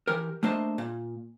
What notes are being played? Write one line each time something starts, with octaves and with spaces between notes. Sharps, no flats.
E3 G4 A#4
A3 A#3 D4 C5 D#5 E5
A#2